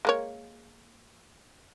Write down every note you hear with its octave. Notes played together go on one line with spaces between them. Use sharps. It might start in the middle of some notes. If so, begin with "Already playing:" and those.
G#3 A#3 C#5